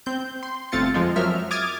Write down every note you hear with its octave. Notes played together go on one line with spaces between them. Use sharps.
C4 G6
C6
G1 A3 C4 F4 A6 C#7
F2 F3 G#3 F4
F#2 F3 F#3 A#4 E5 F6
D6 D#6 F6 G#6 A6